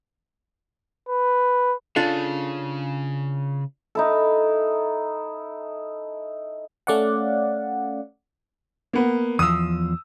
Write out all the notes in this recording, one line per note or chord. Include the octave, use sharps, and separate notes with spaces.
B4
C#3 D4 F4 A4
D#4 E4 A4
A3 C#4 D5 F5 F#5
A#3 B3
E2 F3 D#6 E6